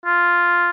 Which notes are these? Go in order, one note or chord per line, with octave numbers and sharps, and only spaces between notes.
F4